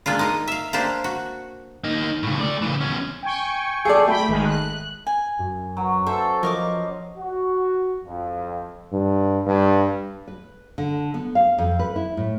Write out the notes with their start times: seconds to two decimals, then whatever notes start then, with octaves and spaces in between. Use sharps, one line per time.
0.06 G#3 A#3 D4 F4
0.19 D#4 A#4 D#5
0.48 E5 F5
0.73 A#3 D4 G4 C5
1.04 F#4
1.84 A#3 D#4
2.23 A2 C#3
2.41 A3 D5
2.62 C#3 E3
2.81 E2 C#4
3.23 G5 G#5 C#6
3.85 G#4 A4 D5
4.07 A3 G5 B5
4.28 G#1 D#3 G#3
4.45 F#6
5.07 G#5
5.39 F#2
5.77 F#3
6.06 C#4 A4 C5 C#5 E5
6.43 F3 A#4 D#5 C#6 D6
7.18 F#4
8.05 F2
8.92 G2
9.47 G2
10.28 B4
10.78 D3
11.14 B3
11.35 F5
11.58 F2
11.79 B4
11.96 E4
12.17 A2